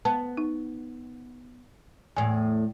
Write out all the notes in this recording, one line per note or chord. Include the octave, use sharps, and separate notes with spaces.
B3 A5
D#4
E2 A2 G#5